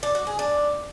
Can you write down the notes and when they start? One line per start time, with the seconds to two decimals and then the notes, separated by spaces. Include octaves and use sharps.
0.03 D4
0.15 F#4
0.27 G#4
0.39 D4